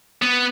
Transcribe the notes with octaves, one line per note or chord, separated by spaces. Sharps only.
B3